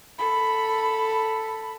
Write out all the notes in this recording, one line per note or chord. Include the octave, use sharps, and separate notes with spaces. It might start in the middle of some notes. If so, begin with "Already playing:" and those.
A4 B5